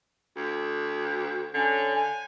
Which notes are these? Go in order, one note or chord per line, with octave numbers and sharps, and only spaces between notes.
D2
D3 C#4
G#5